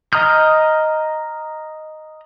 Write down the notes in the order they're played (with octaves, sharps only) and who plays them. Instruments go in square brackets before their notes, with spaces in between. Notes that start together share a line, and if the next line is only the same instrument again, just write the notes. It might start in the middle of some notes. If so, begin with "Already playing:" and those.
[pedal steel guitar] D#5 A#5 D#6 F6 G6